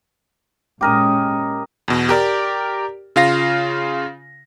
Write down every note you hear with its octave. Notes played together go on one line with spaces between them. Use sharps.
A#2 G#3 C#4 G4 A#4 D#5
E2 B2
G4 A#4 D5
C#3 F4 F5 A#6